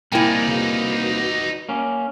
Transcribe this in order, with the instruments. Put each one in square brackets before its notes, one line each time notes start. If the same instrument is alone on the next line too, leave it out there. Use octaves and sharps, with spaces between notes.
[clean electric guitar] C2 A#3 G#5 [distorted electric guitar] D#4 D5 [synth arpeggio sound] E4 G5
[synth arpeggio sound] C#3 [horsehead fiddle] F#4 B4
[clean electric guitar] A#3 C#4